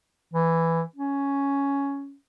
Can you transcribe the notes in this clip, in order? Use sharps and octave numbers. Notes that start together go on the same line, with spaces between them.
E3
C#4